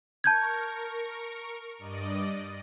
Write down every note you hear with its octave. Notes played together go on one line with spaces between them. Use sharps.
A#4 A5 C#6 G6 G#6
G2 D5 D#5